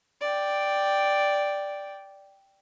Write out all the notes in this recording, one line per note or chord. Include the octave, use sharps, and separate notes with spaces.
D5 G5